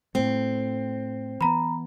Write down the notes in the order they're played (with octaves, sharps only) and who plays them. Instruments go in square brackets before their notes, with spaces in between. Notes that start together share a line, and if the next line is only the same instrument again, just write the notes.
[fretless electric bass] A2 A3 [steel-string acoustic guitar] C4
[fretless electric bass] E3 B3 [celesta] A#5 B5